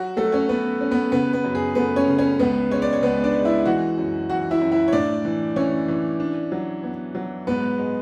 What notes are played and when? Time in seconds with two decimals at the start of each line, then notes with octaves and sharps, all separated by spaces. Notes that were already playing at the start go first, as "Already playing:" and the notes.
Already playing: F#3 F#4
0.17 F#3 A3 A4
0.32 C#4 C#5
0.49 B3 C#4 B4
0.81 C#4
0.91 B3 B4
1.12 C#3 B3 B4
1.33 B3 B4
1.44 F#2
1.55 G#4
1.75 A3 B3 B4
1.96 C#4 C#5
2.08 C#3
2.18 C#4 C#5
2.39 C#2 B3 B4
2.71 G#3 C#4 C#5
2.82 D5
2.93 C#5
3.02 C#2 B3 B4
3.24 D4 D5
3.35 G#3
3.45 E4 E5
3.66 E3 F#4 F#5
3.98 F#2
4.30 E3 F#4 F#5
4.51 E4 E5
4.61 F#2
4.72 E4 E5
4.88 C#5
4.92 A2 D4 D5
5.25 E3
5.56 E3 C#4 C#5
5.88 E3
6.20 D4
6.52 F#3
6.83 B3
7.15 F#3
7.47 G#2 B3 B4
7.78 G#3